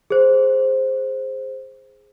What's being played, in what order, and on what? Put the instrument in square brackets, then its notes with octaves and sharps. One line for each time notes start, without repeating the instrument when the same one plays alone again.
[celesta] G#4 C5